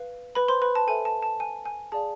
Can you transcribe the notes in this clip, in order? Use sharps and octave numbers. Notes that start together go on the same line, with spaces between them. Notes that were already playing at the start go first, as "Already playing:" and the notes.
Already playing: B4 F5
B4 B5
C5 C6
B4 B5
A5
A4 C5 E5 G#5
A5
A5
G#5
G#5
G#4 D5 F5 A5